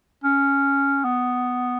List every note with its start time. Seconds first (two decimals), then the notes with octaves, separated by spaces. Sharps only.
0.24 C#4
1.04 B3